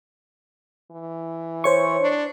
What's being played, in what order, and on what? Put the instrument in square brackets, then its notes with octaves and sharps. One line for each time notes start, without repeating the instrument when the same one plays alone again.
[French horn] E3
[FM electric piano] C5 C#5 C#6
[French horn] D4